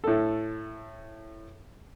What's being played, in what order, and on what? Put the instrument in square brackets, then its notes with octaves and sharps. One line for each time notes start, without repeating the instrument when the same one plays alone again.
[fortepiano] A2 A4